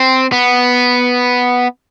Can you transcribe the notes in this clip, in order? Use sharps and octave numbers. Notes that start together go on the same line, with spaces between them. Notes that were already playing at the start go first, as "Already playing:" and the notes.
Already playing: C4
B3